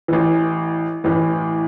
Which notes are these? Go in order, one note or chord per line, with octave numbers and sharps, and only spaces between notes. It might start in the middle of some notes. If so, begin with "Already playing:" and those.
A1 A2 E3
A1 A2 E3